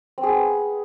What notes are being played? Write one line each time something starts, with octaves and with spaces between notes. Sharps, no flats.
C4
G#4
B3